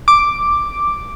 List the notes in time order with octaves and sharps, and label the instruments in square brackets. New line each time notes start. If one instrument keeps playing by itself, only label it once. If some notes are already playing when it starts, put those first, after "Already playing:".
[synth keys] D6